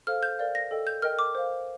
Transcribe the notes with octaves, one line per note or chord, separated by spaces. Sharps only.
A4 C5 F5 F6
G6
A#4 D5 F5
A#6
A4 D#5 G5
G6
A#4 D#5 G5 F6
D6
C5 F5